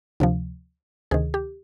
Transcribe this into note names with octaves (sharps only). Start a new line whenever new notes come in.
D2 C3 F3
D2 C3 D#3 G#4
G4